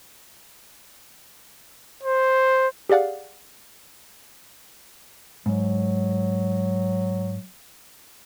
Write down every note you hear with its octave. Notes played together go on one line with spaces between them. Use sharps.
C5
G4 G#4 D5 F5 F#5
G#2 F#3